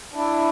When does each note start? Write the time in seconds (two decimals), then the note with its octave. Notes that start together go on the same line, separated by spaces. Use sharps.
0.14 D4 E4